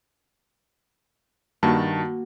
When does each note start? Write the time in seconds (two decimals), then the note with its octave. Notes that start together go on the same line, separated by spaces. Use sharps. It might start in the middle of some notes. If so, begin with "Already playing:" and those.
1.63 G2 D#3 A#3 F#4 A5